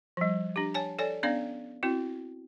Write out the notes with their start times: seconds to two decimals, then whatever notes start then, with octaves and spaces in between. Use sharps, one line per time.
0.17 F3 G3
0.56 D4 G4
0.74 C#5 G#5 A5
0.99 A4 C#5 D5 G#5
1.23 B3 C#4 D4 D5 F5
1.83 C4 E4 F#4